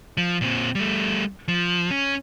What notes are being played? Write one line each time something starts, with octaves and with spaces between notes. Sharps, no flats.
F3
A#2 C4
G3 A3
F3
C#4